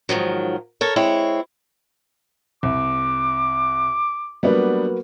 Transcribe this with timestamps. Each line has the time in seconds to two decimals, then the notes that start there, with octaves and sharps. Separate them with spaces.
0.09 G#2 D#3 F3 F#3
0.81 A4 A#4 C#5
0.96 G#3 C4 E4 C#5
2.63 C2 D6
4.43 F#3 G3 A#3 B3 D4 B4